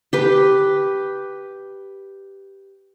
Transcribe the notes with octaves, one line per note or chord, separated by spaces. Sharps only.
G4 B4